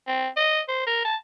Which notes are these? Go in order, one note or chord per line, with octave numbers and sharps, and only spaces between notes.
C4
D#5
C5
A#4
A5